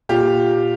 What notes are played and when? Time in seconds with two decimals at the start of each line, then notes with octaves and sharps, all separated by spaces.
0.09 A#2 F4 G4